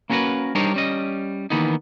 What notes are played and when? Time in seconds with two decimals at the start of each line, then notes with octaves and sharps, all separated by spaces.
0.10 A#3 C#4 F#4 G#4 A#4 B4
0.55 G3 D4 D#4 A#4 C5 C#5
0.74 G3 C#4 D#5
1.50 D#3 E3 A#3 B3 D#4